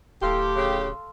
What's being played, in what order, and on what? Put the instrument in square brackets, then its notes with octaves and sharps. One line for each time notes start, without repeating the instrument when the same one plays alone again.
[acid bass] D1 [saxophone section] A2 G4 [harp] A4 F5 C6
[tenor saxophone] C#3